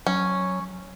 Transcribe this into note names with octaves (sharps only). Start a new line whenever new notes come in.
F#3 C#4